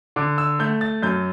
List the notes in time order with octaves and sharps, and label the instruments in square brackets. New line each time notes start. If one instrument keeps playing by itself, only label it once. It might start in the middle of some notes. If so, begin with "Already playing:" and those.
[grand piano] D3 D6
E6
A3 G6
A6
F#2 G6